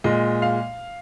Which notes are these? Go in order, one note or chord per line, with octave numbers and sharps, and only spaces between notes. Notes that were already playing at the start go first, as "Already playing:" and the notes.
A#2 G#3 D#5
F5